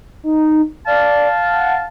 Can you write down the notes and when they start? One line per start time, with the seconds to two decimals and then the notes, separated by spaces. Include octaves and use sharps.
0.23 D#4
0.87 D5 F5 A5
1.51 F#5